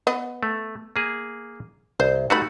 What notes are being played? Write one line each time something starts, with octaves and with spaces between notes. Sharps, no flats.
B3 D#5 F#5
A3
A#3 G#4
C2 C5
G3 A3 D#4 F#4 B5